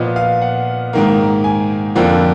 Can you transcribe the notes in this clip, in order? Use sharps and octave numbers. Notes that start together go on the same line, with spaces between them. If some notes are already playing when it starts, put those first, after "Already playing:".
Already playing: A#2 F3 B3 D#5
F5
F#5
G#2 D#3 A#3
G#5
F2 D3 F3 A#3